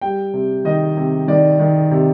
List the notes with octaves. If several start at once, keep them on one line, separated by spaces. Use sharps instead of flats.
G3 G5
C3
D#3 D#5
C3
D#3 D5
D#3
C3